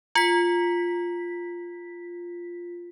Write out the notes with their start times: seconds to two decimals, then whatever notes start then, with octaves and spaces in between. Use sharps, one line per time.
0.15 F4 B6